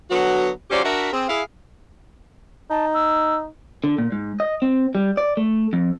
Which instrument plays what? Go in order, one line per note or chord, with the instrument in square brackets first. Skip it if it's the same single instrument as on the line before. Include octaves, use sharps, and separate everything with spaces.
[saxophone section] D3 F#3 B3 F#4
F#3 C#4 F4 G4 C5 D5
D4 F#4 A#4 E5
C4 G#4
E4 G#4 E5 F5
[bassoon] D#4 [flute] A5
[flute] E6
[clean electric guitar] D3
A#2
G#2
D#5
C4
G3
D5
A3
F2